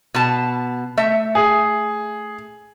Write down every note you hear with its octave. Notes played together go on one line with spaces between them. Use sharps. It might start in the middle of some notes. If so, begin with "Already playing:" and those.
B2 A5
A3 E5
G#4